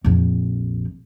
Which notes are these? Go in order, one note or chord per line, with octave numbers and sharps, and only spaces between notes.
A#1 F2